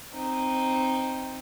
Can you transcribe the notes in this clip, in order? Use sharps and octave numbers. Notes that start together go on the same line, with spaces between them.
C4 D#4